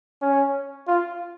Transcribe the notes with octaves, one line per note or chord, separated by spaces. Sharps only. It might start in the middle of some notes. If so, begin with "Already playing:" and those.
C#4
F4